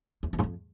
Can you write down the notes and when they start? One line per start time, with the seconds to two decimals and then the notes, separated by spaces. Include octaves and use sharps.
0.23 E2
0.33 E2
0.39 G#2
0.43 F2